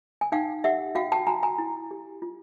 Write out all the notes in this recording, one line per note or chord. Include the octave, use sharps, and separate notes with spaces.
G#5
D#4 F5 G5
G4 E5 F#5
F#4 F5 G5
G5 A5
F#4 G#5 A#5
G#5 A#5
E4
G4
F4